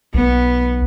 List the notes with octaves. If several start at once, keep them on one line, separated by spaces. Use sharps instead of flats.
B1 B3